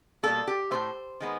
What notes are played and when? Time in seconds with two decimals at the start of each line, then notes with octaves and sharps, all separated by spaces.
0.23 B2 G3 A#3 A4
0.47 G4
0.71 A2 E3 A3 C5
1.20 D#3 G#3 B3